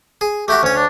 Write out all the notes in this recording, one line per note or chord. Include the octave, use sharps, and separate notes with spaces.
G#4
A3 E4 F#4 G4
D2 C#4 C#5
D4